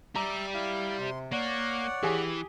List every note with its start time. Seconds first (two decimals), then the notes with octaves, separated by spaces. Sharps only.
0.15 G4 D5 E5 A#5 D6
0.54 E4 F5
0.98 C3 C6
1.32 A#3 C#5 D5 F#5
2.03 E3 G4 G#4 G#5